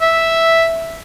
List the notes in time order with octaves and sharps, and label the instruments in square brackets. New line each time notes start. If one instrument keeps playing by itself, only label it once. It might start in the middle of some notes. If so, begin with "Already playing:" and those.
[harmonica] E5